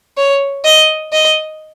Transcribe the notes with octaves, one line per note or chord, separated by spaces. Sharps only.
C#5
D#5
D#5